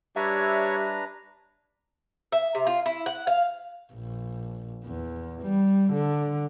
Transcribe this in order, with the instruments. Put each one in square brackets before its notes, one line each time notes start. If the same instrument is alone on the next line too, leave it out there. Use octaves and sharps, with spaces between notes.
[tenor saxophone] G3 [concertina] D4 B4 A#5 [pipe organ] C#5 G#6 [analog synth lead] E5
[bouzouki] E5
C3
F4
E4
F#5
F5
[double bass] A#1
E2
G3
D3